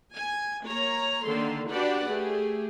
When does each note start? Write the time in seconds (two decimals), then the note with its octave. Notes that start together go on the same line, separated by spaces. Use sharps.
0.14 G#5
0.64 A#3 C#5 A#5
1.25 D3 D#3 A#3 A4 C6
1.70 D4 F#4 G4 B4 D5 F#5
2.07 A3 G4 G#4